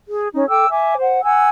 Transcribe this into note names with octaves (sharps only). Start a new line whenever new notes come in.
G#4
C#4 D#4
A4 G5 D6 E6
E5 G#5 D6
C5 F#5
F#5 G#5 E6